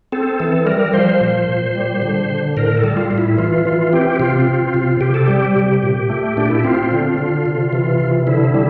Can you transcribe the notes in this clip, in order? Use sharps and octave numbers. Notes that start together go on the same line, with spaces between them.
C4 A4
E3 A4
G3 A#4
F3 C5
A#2
A#2
G3
D3
D3
A2 A#4
A4
G3
F4
A2
E4
E3 F4
E3 F4
C4 G4
C3 F4
C4
C3
C3 G4
A4
G3 G4
C3
A#2
A3
A#2 D4
E4
C4 F4
D3
D3
C3
E3
C3
D3 E4
G3 E4